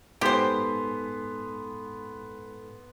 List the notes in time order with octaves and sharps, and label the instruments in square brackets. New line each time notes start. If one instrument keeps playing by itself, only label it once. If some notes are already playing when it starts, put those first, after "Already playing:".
[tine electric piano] G#2 A4 G#5 [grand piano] B3 C6 B6 [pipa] G4 C5